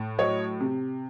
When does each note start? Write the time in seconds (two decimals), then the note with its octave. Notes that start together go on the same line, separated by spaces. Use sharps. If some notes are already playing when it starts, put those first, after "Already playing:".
Already playing: A2
0.19 F#3 C#5 D#5
0.60 C3